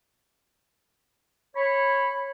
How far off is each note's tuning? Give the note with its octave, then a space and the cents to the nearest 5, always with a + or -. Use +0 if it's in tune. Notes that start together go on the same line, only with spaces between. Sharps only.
C#5 -15 B5 +0